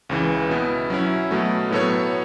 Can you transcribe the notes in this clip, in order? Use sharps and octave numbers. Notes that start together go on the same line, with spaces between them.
C#2 C#3 E3
B2 B3 E4
F#3 C#4 E4
B2 F#3 A3
A2 F#3 B3 A4 C#5